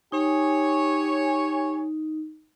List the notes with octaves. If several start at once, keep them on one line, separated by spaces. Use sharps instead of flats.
D#4 G4 C#5 G#5